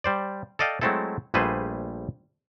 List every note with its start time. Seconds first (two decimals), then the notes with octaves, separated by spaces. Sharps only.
0.04 G3 C5 D5
0.59 A4 D5 D#5 F5 G5
0.81 F#3 G#3 A3 C4 E4 A4
1.34 A#1 G3 A3 G#4 B4 C5